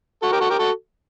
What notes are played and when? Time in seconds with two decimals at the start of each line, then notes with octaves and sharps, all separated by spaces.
0.22 F#4 A4
0.32 G4 A#4
0.40 F#4 A4
0.50 G4 A#4
0.59 F#4 A4